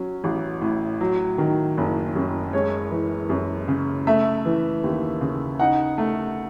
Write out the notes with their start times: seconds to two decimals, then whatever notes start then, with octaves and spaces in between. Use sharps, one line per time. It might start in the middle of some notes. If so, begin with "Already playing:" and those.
Already playing: F#3 C#4
0.24 A1
0.61 A2
1.01 F#3
1.38 D#3
1.77 F#1
2.15 F#2
2.53 G#3 C#5
2.91 E3
3.29 F#2
3.68 C#3
4.07 A3 E5
4.45 E3
4.84 D#2
5.21 C#3
5.59 D#4 F#5
5.98 A3